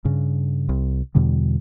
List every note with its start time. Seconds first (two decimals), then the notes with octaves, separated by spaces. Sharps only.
0.05 G2 C#3
0.69 C2
1.15 E2 B2 D3 G3